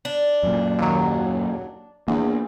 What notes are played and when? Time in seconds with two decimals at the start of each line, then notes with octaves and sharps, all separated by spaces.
0.05 D4
0.43 F#2 A#2
0.78 D#2 F#3
2.08 E2 A#3 D4